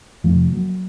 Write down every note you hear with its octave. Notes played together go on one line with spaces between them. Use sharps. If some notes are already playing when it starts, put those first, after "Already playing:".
F2 C3 F3 A3
F#3 A#3